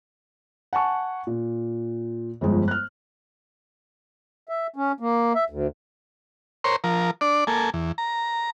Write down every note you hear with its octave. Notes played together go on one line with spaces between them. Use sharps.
F#5 G#5 A5 C#6
A#2
G1 F2 G#3
F6 F#6
E5
C#4
A#3
E5
D2
A#4 C5 C#5 C6
F3 A#4
D4 D5
A#3 A4 G#5
E2
A#5